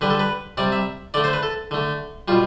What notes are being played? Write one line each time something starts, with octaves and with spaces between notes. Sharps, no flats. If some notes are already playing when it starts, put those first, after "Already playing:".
D3 G3 B4
A4
B4
C3 G3 D5
E5
D3 A3 D5
C5
B4
A4
D3 A3
B2 G3 F4